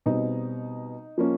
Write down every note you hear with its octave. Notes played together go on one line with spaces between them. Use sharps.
B2 G3 C4 D#4
F3 A#3 C#4